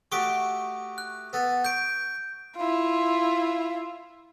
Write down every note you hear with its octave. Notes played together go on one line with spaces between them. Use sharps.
A3 F#4 G4 C#6 D#6 D7
F#6
B3 A4
C#6 G6 D7
E4 F4